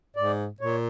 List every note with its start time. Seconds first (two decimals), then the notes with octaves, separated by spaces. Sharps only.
0.16 G#2 D5
0.61 A#2 C#5